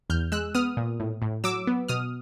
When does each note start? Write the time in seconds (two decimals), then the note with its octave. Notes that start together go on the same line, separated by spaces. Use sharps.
0.10 E2 F6 G6
0.32 G#3 E6 F#6
0.55 B3 D#6 F6
0.77 A#2
1.00 A2
1.22 A2
1.44 F#3 D6 E6
1.67 B3
1.89 B2 D#6 F6